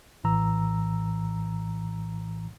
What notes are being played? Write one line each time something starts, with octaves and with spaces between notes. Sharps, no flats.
A#1 A2 E3 A#5 E6